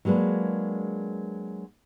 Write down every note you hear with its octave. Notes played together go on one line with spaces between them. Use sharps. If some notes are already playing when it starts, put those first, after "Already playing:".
F#3 G#3 A#3 D4 B4